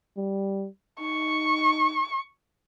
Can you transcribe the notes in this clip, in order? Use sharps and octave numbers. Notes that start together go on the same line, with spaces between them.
G3
D#4 C#6